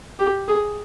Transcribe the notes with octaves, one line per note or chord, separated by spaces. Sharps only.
G4
G#4